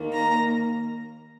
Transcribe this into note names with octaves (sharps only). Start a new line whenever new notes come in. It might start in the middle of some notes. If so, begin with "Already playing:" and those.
Already playing: D#2 D#3 A#3
A#5